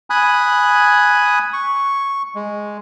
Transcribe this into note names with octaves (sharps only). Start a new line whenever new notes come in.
G#5 B5 D#6 F#6
C#6
G#3